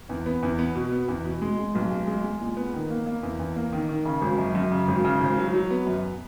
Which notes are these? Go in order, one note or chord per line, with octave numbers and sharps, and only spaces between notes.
E2
B3
E2
B3
B2
B3
E2
B2
G#3
G#3
B1
G#3
G#3
G#3
A#2
B3
D#3
A#3
A#3
E2
E2
A#3
D#3
D#3
C#3
G#1
F#2
F#2
C#3
G#1
C#3
G#1
F#3
F#3
B3
F#2